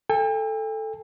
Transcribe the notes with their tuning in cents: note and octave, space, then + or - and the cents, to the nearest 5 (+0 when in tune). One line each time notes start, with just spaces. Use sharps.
A4 +0 G5 +45